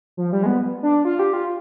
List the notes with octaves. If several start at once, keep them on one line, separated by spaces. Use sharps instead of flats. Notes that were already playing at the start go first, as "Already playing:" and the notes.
F3
G3
G#3
B3
D4
F4
G4
F4